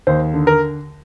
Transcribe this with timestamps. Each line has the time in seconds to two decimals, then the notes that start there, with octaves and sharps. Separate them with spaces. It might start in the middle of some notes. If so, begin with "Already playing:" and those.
0.07 D#2 C5
0.34 D3
0.47 A#4